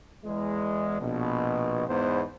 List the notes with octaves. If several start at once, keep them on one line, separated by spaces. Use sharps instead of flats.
E2 G#3
A#1 B2
E2 G#2 B3 D#4 C5